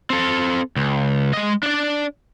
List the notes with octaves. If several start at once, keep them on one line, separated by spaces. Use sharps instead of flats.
C4 A4
C#2
G#3 D#5
D4 D5